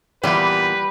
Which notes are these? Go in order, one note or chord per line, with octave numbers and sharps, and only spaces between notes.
E2 A#2 G3 G4 B4 B5